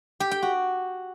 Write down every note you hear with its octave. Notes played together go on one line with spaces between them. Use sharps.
G4
G5
F#4